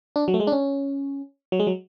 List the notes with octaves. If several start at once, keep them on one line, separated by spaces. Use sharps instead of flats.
D4
F#3
A3
G#3
D4
C#4
F#3
G#3
F#3